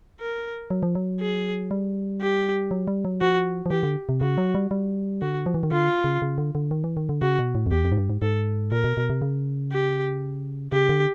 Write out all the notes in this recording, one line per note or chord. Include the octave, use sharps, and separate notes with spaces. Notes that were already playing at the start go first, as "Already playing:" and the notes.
A#4
F#3
F3
F#3
G#4
G3
G4
F#3
G3
F#3
F3 F#4
F3
E3 G4
D3
C3
C#3 F#4
F#3
G3
G3
D3 F#4
F3
E3
D#3
D3 F4
C#3
C#3
D3
D3
D#3
E3
D#3
D3
C#3 F#4
B2
A2
F2
E2 G4
F2
G#2
G2
G#2
G#2 A4
A#2 A#4
B2
B2
C3
C#3
G4
C#3 G4
D3